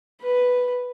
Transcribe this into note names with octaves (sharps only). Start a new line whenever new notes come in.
B4